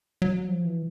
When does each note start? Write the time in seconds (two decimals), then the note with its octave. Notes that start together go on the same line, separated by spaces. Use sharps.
0.22 F#3
0.48 F3
0.65 E3